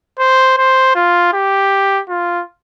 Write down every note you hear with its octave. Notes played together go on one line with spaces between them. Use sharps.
C5
C5
F4
G4
F4